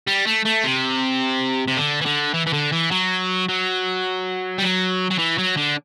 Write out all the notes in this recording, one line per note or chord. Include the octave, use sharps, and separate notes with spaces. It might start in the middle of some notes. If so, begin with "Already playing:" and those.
G3
A3
A3
C3
C3
D3
E3
D3
E3
E3
D3
E3
F#3
F#3
G3
F#3
F#3
E3
F#3
D3